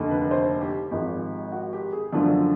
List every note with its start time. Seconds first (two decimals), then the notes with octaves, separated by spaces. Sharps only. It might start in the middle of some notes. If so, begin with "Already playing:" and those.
Already playing: F1 D#2 D3
0.10 B4
0.31 C5
0.61 G4
0.91 G#1 G#2 F3 G#3
1.52 F#4
1.73 G4
1.92 G#4
2.13 F#2 D3 F3 A3 D5